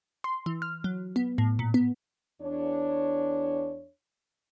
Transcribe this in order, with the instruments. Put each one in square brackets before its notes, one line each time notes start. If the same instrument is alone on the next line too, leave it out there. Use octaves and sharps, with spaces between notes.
[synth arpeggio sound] C6
E3
F6
F#3
B3
A2
A#2
B3
[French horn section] E2 D4 C#5